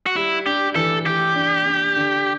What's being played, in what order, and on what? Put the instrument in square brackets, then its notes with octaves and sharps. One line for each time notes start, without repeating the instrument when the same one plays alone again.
[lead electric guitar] F#4
[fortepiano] G3 [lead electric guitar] E4
[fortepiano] D4 [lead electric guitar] G4
[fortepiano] E3 [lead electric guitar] A4
[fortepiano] E3 [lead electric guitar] G4
[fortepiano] D4
D4
D3